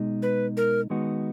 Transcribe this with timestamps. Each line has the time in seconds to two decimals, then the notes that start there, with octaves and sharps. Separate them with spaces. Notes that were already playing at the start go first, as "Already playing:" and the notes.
Already playing: B2 G#3 D#4
0.22 B4
0.57 A#4
0.90 D#3 G#3 B3 D#4 F#4